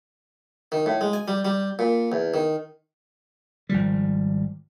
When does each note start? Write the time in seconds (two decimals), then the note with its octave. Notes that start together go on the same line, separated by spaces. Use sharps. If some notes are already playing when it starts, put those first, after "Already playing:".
0.72 D#3
0.86 A2
1.01 G#3
1.13 G#5
1.28 G3
1.45 G3
1.79 A#2
2.12 E2
2.34 D#3
3.69 G#1 F3 G3